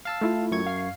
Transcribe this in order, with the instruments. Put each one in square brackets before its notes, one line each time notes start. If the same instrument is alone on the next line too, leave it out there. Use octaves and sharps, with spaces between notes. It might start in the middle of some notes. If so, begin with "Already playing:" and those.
[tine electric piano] F5 A5 E6
[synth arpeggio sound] A3 E4 F4
[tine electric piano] F#2 C#6 G#6
[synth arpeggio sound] F5 C7